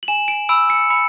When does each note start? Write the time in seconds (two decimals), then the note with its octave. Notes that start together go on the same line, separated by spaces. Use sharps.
0.03 F#7
0.08 G#5 E7
0.28 D7
0.49 B5 E6 D7
0.70 C#7
0.90 B5 C#7